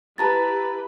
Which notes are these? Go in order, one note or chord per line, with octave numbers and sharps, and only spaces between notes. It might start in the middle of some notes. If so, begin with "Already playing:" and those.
E4 G4 B4 A5 A#5 A6